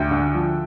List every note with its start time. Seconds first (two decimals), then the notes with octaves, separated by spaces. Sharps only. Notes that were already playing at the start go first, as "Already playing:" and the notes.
Already playing: D2 E5 G5
0.11 D3
0.35 F3